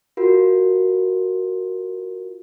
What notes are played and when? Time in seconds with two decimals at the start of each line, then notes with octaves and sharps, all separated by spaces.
0.17 F4 F#4 A#4